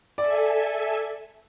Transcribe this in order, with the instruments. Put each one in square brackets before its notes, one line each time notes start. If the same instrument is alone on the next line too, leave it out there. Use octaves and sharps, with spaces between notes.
[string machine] A4 E5 G#5 [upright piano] D5